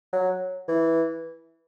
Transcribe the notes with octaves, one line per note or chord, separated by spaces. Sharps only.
F#3
E3